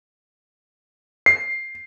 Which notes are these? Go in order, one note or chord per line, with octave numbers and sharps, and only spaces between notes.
C7